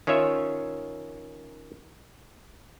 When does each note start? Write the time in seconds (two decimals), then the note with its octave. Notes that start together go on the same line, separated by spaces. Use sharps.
0.07 D#3 C#4 F4 C#5 E5